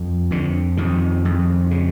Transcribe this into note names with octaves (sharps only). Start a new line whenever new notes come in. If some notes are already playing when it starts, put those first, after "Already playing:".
Already playing: F2
F2 D3
F2 D#3
F2
C#3